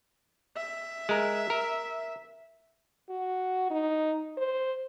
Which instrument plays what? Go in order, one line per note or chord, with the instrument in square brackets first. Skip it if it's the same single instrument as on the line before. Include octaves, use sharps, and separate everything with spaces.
[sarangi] E5
[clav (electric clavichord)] G#3 A#4
A#4
[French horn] F#4
D#4
C5